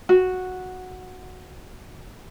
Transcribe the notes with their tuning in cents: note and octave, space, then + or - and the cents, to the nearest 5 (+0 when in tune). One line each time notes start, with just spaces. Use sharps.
F#4 -5